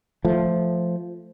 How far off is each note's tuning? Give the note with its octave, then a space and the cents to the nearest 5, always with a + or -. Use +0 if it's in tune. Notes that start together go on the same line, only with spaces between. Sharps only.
F3 -5 A3 +0